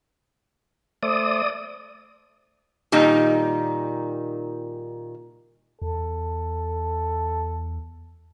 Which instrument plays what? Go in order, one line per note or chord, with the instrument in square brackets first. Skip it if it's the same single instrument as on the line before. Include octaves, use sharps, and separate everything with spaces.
[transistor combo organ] A3 C5 E5 [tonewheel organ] D5 D#6
[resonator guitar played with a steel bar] A#2 D#3 G3 D#4
[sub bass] E2 [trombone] A4